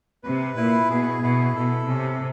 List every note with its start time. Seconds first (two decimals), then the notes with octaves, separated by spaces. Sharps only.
0.23 C3 B4
0.57 A#2 E4
0.90 B2 G#4
1.23 B2 E4
1.55 B2 A4
1.88 C3 C#4